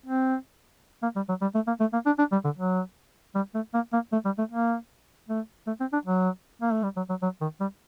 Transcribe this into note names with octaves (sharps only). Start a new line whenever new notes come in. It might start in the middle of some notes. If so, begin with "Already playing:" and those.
C4
A#3
G3
F#3
G3
A3
A#3
A3
A#3
D4
D4
G3
D3
F#3
G3
A3
A#3
A#3
A3
G3
A3
A#3
A3
A3
C4
D4
F#3
A#3
A3
G3
F#3
F#3
F#3
D#3
G3